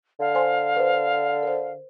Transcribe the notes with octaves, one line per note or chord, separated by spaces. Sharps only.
D3 F5
C5 G#5 C6
B4 C5
A#4 C5